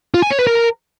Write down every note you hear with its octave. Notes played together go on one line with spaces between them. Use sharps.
F4
G#5
C#5
B4
A#4